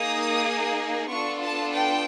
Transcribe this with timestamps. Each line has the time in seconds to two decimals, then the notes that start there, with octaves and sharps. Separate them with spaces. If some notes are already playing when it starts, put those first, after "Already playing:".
Already playing: A#3 D#4 G#4 D#6
1.09 B3 D4 F4 A4 C#6
1.42 A5
1.73 G5